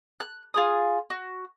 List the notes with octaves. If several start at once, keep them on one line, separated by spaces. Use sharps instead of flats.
F#6
F4 G#4 D#6
F#4